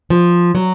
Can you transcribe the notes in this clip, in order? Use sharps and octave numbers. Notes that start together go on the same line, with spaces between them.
F3
F#3